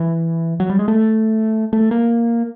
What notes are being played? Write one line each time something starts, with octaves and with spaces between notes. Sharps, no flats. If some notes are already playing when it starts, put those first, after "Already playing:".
Already playing: E3
F#3
G3
G#3
A3
A3
A#3